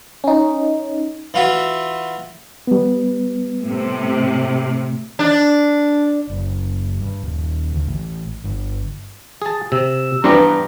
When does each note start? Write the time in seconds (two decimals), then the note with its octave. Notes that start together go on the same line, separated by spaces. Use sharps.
0.24 C#4 D#4
1.34 E3 F4 F#4 E5
2.67 G3 B3
3.62 A2 C3
5.19 D4
6.29 F#1
7.01 G2
7.23 D#1
7.73 D2
7.87 A1
8.44 G1
9.42 G#4 A5
9.72 C3 E6
10.24 G2 E3 G3 B3 D4 G4 A#5